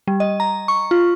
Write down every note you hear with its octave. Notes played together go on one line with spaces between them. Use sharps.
G3
D#5
A#5
C#6
F4